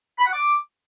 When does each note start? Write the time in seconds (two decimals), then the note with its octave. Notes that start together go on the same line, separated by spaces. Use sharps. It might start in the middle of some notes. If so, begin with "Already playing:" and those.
0.18 B5
0.26 F#5
0.33 D6